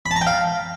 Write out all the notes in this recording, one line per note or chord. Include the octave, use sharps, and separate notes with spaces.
B5
A5
A#5
G5
F5